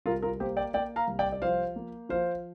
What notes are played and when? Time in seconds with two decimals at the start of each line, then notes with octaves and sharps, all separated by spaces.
0.06 C2 F4 A#4
0.22 F4 A#4
0.40 A#3 G4 C5
0.57 D5 G5
0.74 A#3 D5 G5
0.96 F5 A#5
1.08 C2
1.19 D5 G5
1.32 D5
1.42 F3 C5 F5
1.76 A#3
2.09 F3 C5 F5